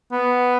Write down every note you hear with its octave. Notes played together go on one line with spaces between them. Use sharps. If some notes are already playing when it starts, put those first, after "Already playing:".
B3